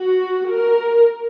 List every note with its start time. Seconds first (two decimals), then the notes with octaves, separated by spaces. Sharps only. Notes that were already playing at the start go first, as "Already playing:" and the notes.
Already playing: F#4
0.49 A#4